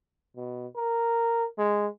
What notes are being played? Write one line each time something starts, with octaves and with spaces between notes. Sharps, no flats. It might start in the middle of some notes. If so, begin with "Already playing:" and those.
B2
A#4
G#3